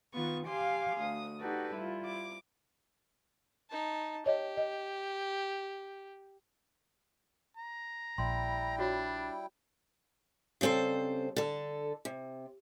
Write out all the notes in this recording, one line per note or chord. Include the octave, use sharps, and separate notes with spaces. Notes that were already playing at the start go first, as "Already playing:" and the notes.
D#3 B3 F4 C#6
G4 F5 G#5 C6 D6
D2 D#6
D#4 F#4 G4 A4 B4 D5
G3 E4 F4
D6
D#4 A5
G4 C#5 D#5
D#5
A#5
A#1 G3 E4 G5 C6
D4 F4 F#4 C#5
C#3 G3 C4 A4 C5
D3 A4
C3